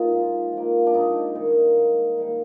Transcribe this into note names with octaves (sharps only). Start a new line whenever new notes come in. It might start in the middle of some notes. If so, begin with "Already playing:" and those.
Already playing: F3 A#3 D#4 F4
G#2
F3 A#3
D4
G#2 D#4
D#3 G3 A#3
G#2
D#3 G3 A#3